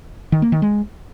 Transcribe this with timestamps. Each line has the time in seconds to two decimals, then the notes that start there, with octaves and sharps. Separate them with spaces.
0.32 D#3
0.42 A#3
0.52 D#3
0.62 G#3